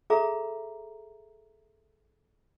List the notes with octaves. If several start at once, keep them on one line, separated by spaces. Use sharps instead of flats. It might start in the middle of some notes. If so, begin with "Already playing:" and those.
G#4 A4 E5 A#5